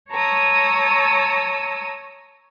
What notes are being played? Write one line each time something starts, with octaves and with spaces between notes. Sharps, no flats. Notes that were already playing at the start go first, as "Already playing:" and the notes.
C#5 A5 A#5 C#6 D#6 E6